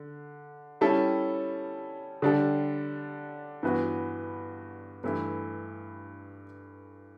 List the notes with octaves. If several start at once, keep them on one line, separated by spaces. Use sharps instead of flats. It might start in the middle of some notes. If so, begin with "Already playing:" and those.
Already playing: D3
G3 C#4 E4 A4
D3 G3 D4 A4
G2 E3 B3 F#4 B4
G2 E3 A3 E4